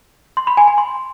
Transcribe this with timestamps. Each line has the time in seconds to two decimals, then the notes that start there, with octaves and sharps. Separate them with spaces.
0.37 C6
0.47 B5
0.57 G#5
0.68 G#5
0.78 C6